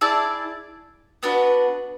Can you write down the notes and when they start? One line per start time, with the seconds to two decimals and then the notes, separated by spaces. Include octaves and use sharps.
0.01 E4 G#4 D5 A5
1.23 B3 D4 F#4 B4